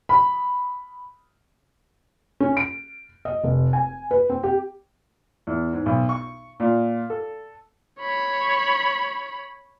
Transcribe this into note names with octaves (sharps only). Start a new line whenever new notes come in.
B5
C#4
D7
D#5
F1
G#5
B4
C4
G4
E2
G#2
B1
C#6
A#2
A4
C#5 B5